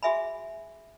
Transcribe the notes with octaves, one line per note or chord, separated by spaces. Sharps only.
F#4 G#4 E5 G#5 B5